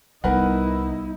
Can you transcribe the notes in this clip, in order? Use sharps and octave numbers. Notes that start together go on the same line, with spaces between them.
C2 G3 B3 D#4 E4 A#4 B4 F#5